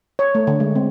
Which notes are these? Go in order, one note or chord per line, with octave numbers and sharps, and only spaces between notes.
C#5
A3
D3
G#3
C4